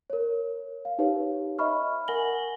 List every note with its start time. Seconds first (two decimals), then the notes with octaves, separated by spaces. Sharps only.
0.10 A#4 C#5
0.85 F5
0.99 D#4 G4 B4 C#5 F5
1.59 D#5 E5 B5 C#6 F6
2.08 A#4 F#5 G#5 A#6 F#7 G7